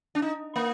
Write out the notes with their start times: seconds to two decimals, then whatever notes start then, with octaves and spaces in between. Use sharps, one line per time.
0.15 D4
0.22 D#4
0.56 A#3